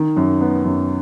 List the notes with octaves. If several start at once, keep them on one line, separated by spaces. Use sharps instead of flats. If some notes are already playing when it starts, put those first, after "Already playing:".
Already playing: D#3
F#2
B3
F#2